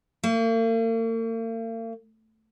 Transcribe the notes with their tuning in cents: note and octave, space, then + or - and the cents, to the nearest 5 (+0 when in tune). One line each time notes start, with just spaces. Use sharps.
A#3 -45